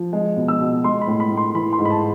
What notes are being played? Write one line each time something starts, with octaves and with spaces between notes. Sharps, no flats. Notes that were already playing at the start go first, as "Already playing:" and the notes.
Already playing: F3
G#3
B2
E6
B2
G#3 C6
B5
A2
B5
A2
C6
E3 B5
C6
G#2
B5
A5